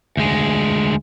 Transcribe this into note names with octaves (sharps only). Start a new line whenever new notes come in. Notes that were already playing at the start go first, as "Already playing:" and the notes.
D2 G#3